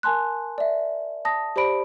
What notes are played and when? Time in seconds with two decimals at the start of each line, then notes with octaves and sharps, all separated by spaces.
0.03 A#4 G#5 A5 C6 F#6
0.58 D5 E5
1.25 A5 D#6 A#6
1.56 G4 C5 D5 B5 D7